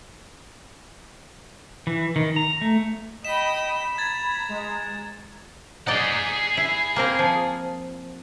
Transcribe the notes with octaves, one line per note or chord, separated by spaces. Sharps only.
E3
D#3
A#5
A3
D#5 G5 B5 B6 E7
A#5 G#6 A6
G#3
D#4 G#4 D5 D#5 F#5
E4
A#3 C4 A#4
F3